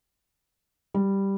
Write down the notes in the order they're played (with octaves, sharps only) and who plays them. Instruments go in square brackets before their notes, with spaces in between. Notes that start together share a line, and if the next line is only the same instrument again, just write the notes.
[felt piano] G3